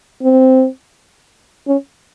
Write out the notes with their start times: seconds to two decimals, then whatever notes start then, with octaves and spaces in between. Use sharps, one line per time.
0.23 C4
1.68 C#4